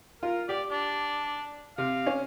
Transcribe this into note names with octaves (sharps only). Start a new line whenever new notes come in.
F4 A#4
G4 D5
D4
C3 F5
C#4